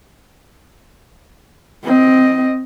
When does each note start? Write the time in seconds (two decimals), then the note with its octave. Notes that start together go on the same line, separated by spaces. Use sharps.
1.84 C4 D#5